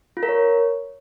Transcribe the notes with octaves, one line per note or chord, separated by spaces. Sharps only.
F4
A#4
C#5